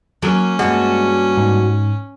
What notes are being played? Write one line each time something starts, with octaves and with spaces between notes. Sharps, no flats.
F#3 A#3 C#4
G2 A#2 G#3 D4 F#4
G#2